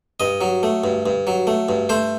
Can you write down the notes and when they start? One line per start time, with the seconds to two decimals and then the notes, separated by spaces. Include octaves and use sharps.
0.20 G2 D#5
0.41 F#3
0.63 A3
0.84 G2
1.06 G2
1.27 F#3
1.47 A3
1.69 G2
1.89 A3 C5